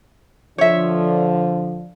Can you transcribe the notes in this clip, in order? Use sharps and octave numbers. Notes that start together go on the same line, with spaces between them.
D3 F3 C#5 E5